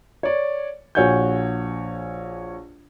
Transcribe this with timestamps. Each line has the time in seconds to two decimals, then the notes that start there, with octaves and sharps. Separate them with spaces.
0.23 C#5 D5
0.95 A#1 F#4 C#5 F#5 G#5 G6